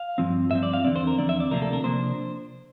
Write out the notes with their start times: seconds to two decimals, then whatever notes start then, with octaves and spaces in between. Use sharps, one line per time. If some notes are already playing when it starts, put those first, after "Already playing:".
Already playing: F5
0.18 G2 F3 C4
0.51 G2 F3 C4 E5
0.63 D5
0.73 F5
0.85 E2 D3 F3 C4 D5
0.96 C5
1.07 A#4
1.18 E2 D3 F3 C4 D5
1.29 E5
1.40 D5
1.51 D2 C3 F3 A#3 D4 A#4
1.62 A4
1.73 A#4
1.84 C3 F3 A#3 D4 C5